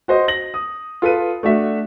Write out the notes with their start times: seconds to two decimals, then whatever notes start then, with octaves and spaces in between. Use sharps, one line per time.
0.08 F#4 C5 D#5
0.28 A#6 F#7
0.54 D#6
1.02 F4 A4 B4 D#7
1.43 A3 D4 F#4 E5